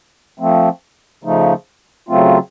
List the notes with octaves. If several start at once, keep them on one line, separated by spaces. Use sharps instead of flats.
F3 A3 C4
C#3 F3 A3 D#4
C#3 F#3 A3 C4 F4